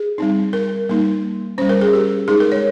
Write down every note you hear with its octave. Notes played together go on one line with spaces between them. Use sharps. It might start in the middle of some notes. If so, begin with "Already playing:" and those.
Already playing: G#4
G3 C4 D#4
A#4
G3 A#3 D#4
G3 C#4 C5
A#4
G#4
G4
G#3 D#4 G#4
A#4
C#5